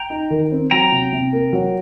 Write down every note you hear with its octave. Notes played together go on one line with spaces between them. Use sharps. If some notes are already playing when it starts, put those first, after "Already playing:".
Already playing: G5 A#5
D#4
D#3
C4
F#3 G5 A#5
C3
C3
A#3
F#3